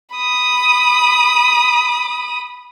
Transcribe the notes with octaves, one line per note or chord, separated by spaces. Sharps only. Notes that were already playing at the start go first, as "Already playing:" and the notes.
B5 D#6